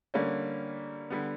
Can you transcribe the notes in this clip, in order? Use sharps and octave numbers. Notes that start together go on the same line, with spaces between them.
D3 G3 A#3 C#4
D3 G3 B3